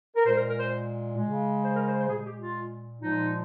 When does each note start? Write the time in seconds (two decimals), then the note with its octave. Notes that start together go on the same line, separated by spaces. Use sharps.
0.16 A#4
0.26 A#2 G#3 C5
0.36 A#4
0.49 A#4
0.59 C5
1.18 C#3 G#3
1.64 C5
1.74 A#4
1.87 C5
1.98 C5
2.09 A#2 G#3 G#4
2.26 G4
2.40 F4
3.02 A#2 F3 G#3 D#4